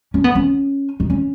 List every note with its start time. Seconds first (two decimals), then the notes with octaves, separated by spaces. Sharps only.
0.14 C#4
0.24 B3
0.35 C#4
1.00 D#4
1.10 C#4